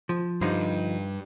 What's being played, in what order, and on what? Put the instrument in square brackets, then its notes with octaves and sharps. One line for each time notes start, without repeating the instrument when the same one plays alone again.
[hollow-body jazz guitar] F3
[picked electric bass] G2 [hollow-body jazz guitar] D3 F3 D#4